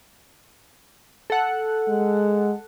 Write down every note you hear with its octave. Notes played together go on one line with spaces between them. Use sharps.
A4 F#5
G#3